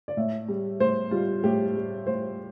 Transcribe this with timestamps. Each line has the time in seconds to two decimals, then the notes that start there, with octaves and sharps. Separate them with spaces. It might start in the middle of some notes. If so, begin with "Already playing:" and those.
0.08 D5
0.17 A2 E5
0.48 G3
0.80 A2 C5
1.11 G3 F4
1.44 A2 G4
1.76 G3
2.07 A2 C5